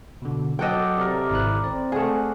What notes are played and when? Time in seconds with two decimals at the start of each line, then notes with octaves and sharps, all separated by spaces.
0.22 B2 D3
0.59 F#3 A4 D#5 F#5 G5 A5 D6 E6
0.97 C3 A#4 D5
1.30 G#1 E4 F#6
1.64 C4 D5
1.92 A3 G#4 F#5